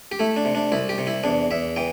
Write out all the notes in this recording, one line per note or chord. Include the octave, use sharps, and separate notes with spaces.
G4
A3 E4
D4
C3
D4
C2 E4
G4
C3
E4
E2 D4
E2 E5
E3 G5